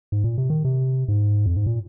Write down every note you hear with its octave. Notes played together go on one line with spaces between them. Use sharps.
G#2
A#2
C3
D#3
C3
G#2
F2
G#2
A#2